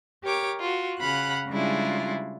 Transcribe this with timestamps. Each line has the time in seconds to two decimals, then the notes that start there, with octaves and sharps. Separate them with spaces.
0.24 G4 A#4 C#5 D6
0.60 F4 F#4
0.99 C#3 F5 F#5 B5 F#6
1.49 C#3 G3 G#3 D4 E4 F4